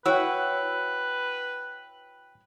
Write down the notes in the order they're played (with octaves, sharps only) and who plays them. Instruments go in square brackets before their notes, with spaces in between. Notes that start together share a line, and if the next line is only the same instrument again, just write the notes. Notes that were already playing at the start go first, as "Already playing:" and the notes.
[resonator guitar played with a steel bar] E4 F#4 [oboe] B4 [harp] C#5 F#5 [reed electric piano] G5 E6